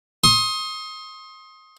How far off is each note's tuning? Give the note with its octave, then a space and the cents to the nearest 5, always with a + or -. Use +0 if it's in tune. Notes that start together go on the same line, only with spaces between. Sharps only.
C6 +35 D#6 +15